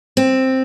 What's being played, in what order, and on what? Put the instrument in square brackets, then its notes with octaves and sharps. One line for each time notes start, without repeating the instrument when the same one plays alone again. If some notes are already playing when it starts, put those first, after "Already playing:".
[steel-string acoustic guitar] C4